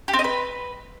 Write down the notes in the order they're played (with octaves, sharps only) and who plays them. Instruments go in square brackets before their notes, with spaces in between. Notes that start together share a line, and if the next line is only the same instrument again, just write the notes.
[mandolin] G4
C4
D#5
B4